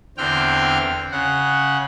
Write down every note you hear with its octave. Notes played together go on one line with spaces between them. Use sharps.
E2 D3 C4 G5 F6
C#3 F#5